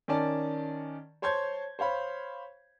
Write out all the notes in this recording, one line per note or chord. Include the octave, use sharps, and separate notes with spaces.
D#3 C#4 D5 A5
C5 C#5 A5 C6 G6 G#6
C5 C#5 F5 B5